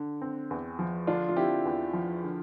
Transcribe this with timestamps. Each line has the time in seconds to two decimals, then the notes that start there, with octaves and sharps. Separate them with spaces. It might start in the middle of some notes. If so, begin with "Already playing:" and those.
Already playing: D3
0.22 C4
0.51 E2
0.79 F3
1.07 D3 D4 F4
1.29 F4
1.36 C4 E4 G4
1.65 E2
1.93 F3
2.23 D3